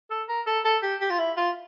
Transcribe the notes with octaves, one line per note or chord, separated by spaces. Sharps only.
A4
A#4
A4
A4
G4
G4
F4
E4
F4